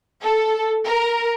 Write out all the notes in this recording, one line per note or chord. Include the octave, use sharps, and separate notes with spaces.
A4
A#4